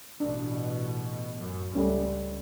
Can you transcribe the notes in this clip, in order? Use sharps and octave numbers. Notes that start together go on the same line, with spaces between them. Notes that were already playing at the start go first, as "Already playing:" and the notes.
A1 B2 D4
F#2
C#2 G3 A3 C#4